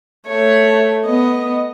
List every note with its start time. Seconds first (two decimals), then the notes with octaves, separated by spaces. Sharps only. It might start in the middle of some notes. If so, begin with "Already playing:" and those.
0.28 A3 C#5
1.06 B3 D#5